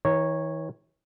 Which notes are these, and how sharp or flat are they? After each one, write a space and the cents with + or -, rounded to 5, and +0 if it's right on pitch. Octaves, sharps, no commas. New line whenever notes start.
E3 -45 C#5 -10 A#5 +0